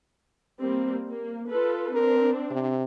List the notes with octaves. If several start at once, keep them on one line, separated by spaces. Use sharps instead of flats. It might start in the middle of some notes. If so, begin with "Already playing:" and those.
G3 A#3 C4
A#3
F4 A4 B4
C4 D4 A#4
C3